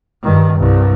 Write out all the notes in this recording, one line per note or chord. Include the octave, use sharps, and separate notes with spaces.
G2 D#3
C2 G2